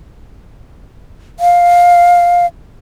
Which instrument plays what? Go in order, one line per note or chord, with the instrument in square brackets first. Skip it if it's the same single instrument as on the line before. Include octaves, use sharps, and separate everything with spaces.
[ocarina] F5